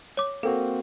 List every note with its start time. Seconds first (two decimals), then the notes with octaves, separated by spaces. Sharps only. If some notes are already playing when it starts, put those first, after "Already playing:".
0.17 C#5 D6
0.43 A#3 C4 F#4 A4